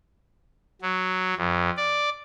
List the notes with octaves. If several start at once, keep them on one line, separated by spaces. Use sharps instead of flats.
F#3
F2
D5